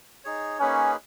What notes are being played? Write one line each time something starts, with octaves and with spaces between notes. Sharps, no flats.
D#4 G#4 C#5
A#3 C#4 D#4 G#4 B4